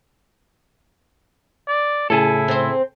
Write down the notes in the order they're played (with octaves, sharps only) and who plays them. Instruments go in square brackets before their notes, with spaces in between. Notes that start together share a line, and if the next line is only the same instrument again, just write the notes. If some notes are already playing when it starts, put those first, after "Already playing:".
[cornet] D5
[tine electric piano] A2 C#3 [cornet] E4 [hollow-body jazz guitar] G#4 A4
[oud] C4 C5